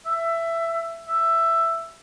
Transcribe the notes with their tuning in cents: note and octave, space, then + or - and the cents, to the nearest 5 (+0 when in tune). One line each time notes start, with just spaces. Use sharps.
E5 +15
E5 +10